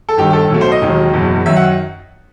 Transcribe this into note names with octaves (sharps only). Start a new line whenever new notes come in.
A4
G1 G2 D#3 G4
G4
A4
B1 B2 A3
C5
D#5
E1 D#2 D#3 F#3
F#1 E2 B2 F#3
F#2 D#3 F#3 E5
F#5